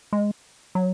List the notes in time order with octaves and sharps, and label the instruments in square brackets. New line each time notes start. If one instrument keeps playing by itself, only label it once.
[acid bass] G#3
F#3